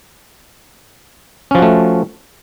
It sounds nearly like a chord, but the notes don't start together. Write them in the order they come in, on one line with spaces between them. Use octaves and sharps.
C#4 F3 F#4 A3